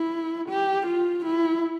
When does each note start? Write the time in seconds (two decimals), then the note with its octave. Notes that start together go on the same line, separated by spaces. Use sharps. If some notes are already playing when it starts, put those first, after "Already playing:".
Already playing: E4
0.49 G4
0.87 F4
1.25 E4